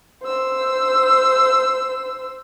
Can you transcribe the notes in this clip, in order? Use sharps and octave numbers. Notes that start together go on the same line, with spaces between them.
C5 E6